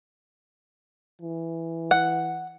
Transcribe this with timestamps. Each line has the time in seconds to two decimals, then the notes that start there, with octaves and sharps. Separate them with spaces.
1.22 E3
1.91 F#5